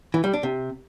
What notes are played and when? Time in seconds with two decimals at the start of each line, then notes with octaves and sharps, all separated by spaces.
0.14 E3
0.24 G3
0.33 D4
0.43 C3